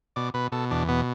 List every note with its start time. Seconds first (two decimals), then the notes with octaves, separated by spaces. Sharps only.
0.16 B2 D5
0.34 B2 B4
0.52 B2 A4
0.71 E2 D4
0.88 B2 B3